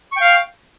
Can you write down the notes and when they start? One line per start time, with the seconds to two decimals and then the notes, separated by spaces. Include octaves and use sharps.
0.12 C#6
0.17 G5
0.21 F5